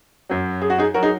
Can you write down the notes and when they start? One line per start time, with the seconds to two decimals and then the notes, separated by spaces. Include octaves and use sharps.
0.29 F#2 F#3
0.62 G#4
0.70 F#4
0.78 D#4 G#4
0.94 F#3 F#4 A#4
1.03 D#4 G#4